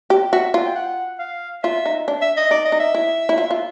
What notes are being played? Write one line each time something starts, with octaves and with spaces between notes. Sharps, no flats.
G4
F#4 E5
E5
F4
G5
F#5
F5
F4 E5
D#4
D4
E5
D#5
D#4 D5
D#5
D#4
E5
E4
E4
F4
F4